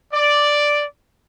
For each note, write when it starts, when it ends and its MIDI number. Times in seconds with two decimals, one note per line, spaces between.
0.13 0.83 74